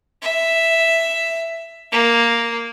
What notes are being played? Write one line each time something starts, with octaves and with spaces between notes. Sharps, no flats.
E5
A#3